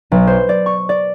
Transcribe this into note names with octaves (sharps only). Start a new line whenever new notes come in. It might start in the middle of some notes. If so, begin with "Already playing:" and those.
B1
C5
D5
C#6
D5